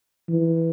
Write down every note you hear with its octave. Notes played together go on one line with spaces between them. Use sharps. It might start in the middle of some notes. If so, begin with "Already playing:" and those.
E3